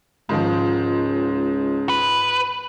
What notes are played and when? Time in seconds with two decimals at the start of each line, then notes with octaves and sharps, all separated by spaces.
0.29 C#2 G#2 D#3 F3
1.89 B4